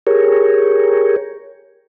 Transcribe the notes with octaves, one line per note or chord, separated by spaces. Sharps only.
G4 G#4 A#4 C#5